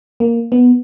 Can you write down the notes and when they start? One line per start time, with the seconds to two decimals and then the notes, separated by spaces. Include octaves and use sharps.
0.20 A#3
0.52 B3